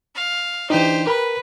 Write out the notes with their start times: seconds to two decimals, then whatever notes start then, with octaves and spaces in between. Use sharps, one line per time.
0.15 F5
0.70 E3 D4 D#4 G4 C5
1.07 A#4 B4 B5